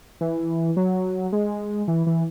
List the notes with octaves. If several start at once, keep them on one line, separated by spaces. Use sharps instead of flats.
E3
F#3
G#3
E3
E3